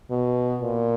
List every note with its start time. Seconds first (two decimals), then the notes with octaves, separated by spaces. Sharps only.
0.11 B2
0.62 A#2